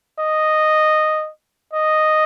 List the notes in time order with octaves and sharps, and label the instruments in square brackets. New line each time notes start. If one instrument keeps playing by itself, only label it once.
[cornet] D#5
D#5